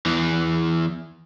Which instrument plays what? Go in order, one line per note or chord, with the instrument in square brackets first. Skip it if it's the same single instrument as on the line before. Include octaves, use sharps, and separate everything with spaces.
[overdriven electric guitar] E2 E3